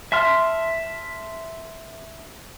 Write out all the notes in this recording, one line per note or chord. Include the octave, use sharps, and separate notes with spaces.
E5 A5 C6 F6